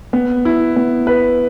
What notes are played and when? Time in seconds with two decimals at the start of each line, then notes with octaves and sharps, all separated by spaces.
0.13 B3
0.45 E4
0.76 B3
1.07 B4